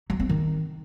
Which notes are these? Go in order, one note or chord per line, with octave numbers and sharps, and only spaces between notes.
F#3
C4
D#3